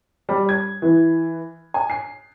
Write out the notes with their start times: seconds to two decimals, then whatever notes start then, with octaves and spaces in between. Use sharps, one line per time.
0.29 G3
0.49 G#6
0.82 E3
1.74 G#5
1.90 C7